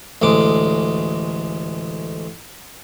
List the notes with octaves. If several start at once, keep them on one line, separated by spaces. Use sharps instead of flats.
A1 D2 G#3 D6